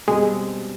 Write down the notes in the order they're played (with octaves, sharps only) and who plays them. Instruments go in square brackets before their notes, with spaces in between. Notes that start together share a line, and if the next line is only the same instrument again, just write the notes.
[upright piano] B2 G3 C4 [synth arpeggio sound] G#3